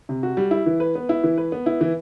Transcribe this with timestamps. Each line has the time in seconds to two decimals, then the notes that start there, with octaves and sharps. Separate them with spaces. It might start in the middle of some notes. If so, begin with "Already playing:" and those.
0.09 C3
0.23 F#4
0.37 G3
0.51 E4
0.66 E3
0.80 B4
0.95 B3
1.09 E4
1.24 E3
1.38 B4
1.52 B3
1.66 E4
1.81 E3